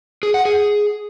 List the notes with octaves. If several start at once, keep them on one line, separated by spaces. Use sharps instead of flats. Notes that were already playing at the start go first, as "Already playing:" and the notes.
G#4
F#5
G#4